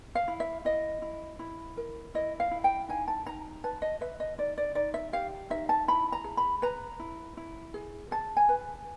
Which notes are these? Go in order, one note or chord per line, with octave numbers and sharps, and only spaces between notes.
F5
E4
E5
E4 D#5
E4
E4
A#4
E4 D#5
F5
E4
G5
D#4 G#5
A5
D#4 A#5
B4 A5
D#5
B4 E5
D#5
D#4 D5
D5
D#4 D5
E5
G4 F5
D#4 E5
A5
E4 B5
A#5
G#4
B5
B4 A#5
E4
E4
G#4
G#4 A5
G#5
B4